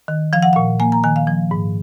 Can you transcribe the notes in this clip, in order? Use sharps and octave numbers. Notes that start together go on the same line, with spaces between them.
D#3
F3 F5
F#5
A#2 F5
A#3 G#5
A#5
D#3 G#5
F5
F3
G#2